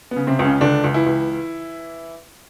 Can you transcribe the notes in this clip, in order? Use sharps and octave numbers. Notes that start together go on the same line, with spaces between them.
B3
C#3
C3 C4
C#2
C#3 C#4
C#2 D3 D4
C#2
E3 E4
C#2